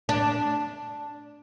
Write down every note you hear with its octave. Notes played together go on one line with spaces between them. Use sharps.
D4